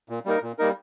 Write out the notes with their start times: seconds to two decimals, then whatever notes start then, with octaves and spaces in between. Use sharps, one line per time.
0.09 A#2
0.26 G3 A#3 D#4 A#4
0.42 A#2
0.58 G3 A#3 D#4 A#4